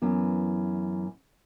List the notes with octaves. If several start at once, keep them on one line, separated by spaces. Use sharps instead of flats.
F#2 E3 B3